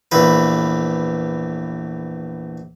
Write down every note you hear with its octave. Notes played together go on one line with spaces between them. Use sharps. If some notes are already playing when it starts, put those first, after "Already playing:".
A#1 E2 B4